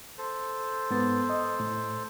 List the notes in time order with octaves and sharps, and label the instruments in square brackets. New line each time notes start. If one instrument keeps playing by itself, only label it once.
[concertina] A4 C5
[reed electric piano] G#2 B3 A6
D#5
A2